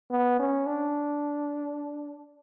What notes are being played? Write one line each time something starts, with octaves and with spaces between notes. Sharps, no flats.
B3
C#4
D4